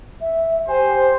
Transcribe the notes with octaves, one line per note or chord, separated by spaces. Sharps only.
E5
G4 C5 G#5